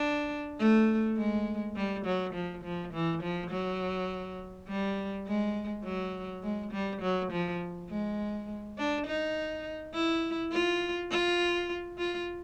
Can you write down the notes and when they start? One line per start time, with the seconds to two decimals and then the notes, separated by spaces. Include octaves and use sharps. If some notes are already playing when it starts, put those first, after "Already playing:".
Already playing: D4
0.59 A3
1.17 G#3
1.76 G3
2.05 F#3
2.34 F3
2.64 F3
2.93 E3
3.23 F3
3.51 F#3
4.68 G3
5.27 G#3
5.84 F#3
6.43 G#3
6.72 G3
7.02 F#3
7.32 F3
7.90 G#3
8.78 D4
9.07 D#4
9.94 E4
10.52 F4
11.11 F4
11.98 F4